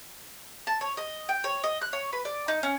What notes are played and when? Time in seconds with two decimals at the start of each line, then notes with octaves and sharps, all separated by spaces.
0.67 A5
0.81 C#5
0.97 D#5
1.29 G5
1.44 C#5
1.64 D#5
1.82 F#6
1.93 C#5
2.13 B4
2.25 D5
2.48 D#4
2.63 C#4